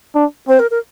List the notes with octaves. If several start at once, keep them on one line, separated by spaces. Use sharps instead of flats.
D4
C4 C5
A#4
A#4